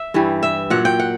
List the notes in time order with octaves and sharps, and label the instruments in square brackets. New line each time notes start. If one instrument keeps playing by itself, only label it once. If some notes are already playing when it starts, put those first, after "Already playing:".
Already playing: [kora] E5
G2 E3 G3
E5
A#2 F#3 F#5
G5
F#5